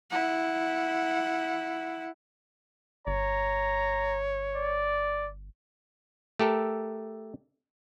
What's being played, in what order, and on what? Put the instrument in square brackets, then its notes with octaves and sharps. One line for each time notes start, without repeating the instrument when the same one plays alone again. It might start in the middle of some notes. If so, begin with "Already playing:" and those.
[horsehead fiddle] E4 F#5
[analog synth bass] G1 [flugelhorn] C#5 [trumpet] A#5
[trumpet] D5
[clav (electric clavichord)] A3 G4 A4 A#4